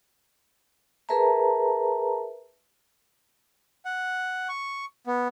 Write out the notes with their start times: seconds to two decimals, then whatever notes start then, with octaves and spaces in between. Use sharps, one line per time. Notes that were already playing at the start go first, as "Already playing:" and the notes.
1.09 G#4 A#4 B4 E5 A5 A#5
3.85 F#5
4.49 C#6
5.07 B3